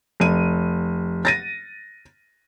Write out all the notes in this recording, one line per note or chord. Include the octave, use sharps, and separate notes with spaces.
F1 D#7
A6 A#6 D#7